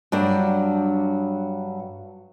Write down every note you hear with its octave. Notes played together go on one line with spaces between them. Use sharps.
G2 F#3 D4